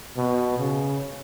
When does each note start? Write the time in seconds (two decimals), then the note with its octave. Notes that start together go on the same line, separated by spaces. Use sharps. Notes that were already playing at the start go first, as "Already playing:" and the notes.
0.17 B2
0.59 C#3